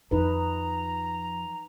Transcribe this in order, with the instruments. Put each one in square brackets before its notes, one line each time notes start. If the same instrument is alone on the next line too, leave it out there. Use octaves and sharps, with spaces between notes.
[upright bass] F2 F3 [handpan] D#4 B4 [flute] A#5